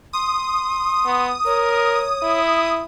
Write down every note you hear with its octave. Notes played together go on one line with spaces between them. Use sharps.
C6 D#6
B3
A#4 C#5
E4